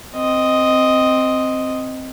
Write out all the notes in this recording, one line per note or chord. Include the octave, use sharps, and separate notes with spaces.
C4 D#5